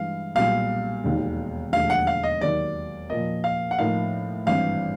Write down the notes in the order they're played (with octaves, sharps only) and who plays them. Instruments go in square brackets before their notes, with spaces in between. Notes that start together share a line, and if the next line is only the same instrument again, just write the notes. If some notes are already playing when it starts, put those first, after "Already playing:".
Already playing: [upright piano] G2 E3 G#3 [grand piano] F5
[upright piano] B1 A#2 G3 [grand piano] F5
[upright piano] E1 D#2 D#3
[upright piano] E1 D#2 D3 F3 A3 [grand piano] F5
[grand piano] F#5
F5
D#5
[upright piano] D#2 D#3 F#3 A#3 [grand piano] D5
[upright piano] A#2 F3 A#3 [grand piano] D#5
[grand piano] F5
F#5
[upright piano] A2 F3 A#3 D#4 [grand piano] F5
[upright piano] G#1 G2 E3 [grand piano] F5